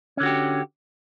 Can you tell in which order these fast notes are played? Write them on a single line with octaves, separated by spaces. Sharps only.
C#4 D3 F#4 G4